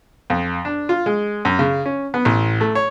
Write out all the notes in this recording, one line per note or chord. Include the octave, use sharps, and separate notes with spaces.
F2
D4
F4
G#3
F#2
C#3
C#4
B3
A1
A3
C#5